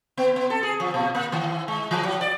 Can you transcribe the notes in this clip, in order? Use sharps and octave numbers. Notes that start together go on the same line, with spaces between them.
B3
B3
A4
G#4
F3
A#2
A#3
D#3
G#3
E3
F#3
D5